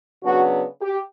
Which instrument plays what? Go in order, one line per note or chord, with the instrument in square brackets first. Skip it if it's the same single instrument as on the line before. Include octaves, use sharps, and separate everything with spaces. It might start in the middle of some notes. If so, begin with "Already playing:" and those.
[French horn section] C#3 F#3 B3 D4 F#4
G4